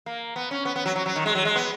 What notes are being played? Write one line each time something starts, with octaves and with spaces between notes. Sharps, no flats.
A#3
B3
C#4
B3
B3
F#3
F#3
F#3
D#3
G#3
F#3
G#3
B3